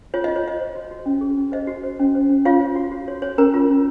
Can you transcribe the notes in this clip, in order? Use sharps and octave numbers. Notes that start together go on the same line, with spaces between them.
F4 C#5
D#5
F4
C#5
F4 D#5
C5
F#4
F#4
C#4
G#4
C#4
C5 D#5
F#4
C5
C#4
C5
C#4
F4 C#5 F5
C#5
F#4
F#4
C#5
C#5
C#4 A#4 A#5
F4
C#4